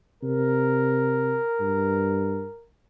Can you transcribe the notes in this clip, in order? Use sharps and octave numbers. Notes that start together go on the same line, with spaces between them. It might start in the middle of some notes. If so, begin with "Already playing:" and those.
C3 A#4
G2